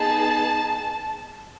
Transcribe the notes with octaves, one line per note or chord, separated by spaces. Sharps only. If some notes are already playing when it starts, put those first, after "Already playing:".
Already playing: B3 D#4 G#4 A5